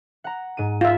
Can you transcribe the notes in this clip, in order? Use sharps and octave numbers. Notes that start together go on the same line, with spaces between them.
F#5 A#5
G#2 D#7
F4 E5